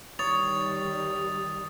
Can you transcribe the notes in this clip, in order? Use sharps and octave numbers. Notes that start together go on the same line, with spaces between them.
D#3 G3 C#5 D#6 A6 F7